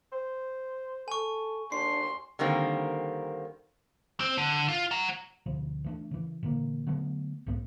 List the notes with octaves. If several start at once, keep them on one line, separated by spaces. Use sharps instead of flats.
C5
A4 G#5 C#6
D#2 D4 C6 C7
D3 D#3 G3 A#3 C4
C4
D3
F4
F#5 A#5
D2 B2 F3
E3 A3 D4
C#3 E3
A#2 D3 E3 A#3
D3 F#3 A3 B3
B1 G#2 A3 B3